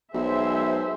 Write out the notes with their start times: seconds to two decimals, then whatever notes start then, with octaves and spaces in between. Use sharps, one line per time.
0.14 B1 G#3 C5 E5